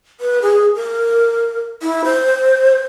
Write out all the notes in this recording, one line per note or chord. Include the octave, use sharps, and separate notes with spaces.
B4
G#4
A#4
E4
C5